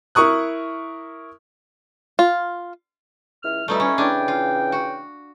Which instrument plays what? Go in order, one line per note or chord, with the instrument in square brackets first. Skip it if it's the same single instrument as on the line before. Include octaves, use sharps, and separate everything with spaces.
[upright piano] E4 A#4 C#6 D#6 F#6
[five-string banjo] F4
[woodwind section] C#2 E4 F6
[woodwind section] F2 B2 G3 [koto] A3 D#4 E4
[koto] C#4
[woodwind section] C#3 E3 G5 [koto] D4 G#5
[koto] F4
F#4